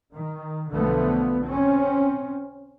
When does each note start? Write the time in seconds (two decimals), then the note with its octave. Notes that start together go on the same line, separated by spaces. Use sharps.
0.13 D#3
0.71 B1 D3 F3 A3 B3
1.46 C4 C#4